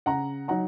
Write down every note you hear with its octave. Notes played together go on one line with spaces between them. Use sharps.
C#3 F#5 A#5
F#3 D#4 F#5 A#5